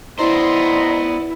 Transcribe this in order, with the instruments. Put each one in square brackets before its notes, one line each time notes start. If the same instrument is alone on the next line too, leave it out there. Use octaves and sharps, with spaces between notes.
[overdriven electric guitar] B3 C5 [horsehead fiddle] E4 [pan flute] D5 [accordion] D#5 A#5 C6